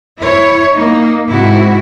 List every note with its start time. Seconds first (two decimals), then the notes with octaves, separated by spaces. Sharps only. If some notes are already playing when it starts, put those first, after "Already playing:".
0.21 E4 C#5
0.73 A#3 D#4
1.27 G#2 C3 E4 F#4